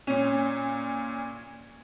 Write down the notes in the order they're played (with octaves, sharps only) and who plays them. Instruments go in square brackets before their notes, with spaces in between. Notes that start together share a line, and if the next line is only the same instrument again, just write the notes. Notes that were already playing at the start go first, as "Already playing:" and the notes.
[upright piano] A#2 C#4